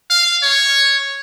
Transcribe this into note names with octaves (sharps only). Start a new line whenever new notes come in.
F5
C#5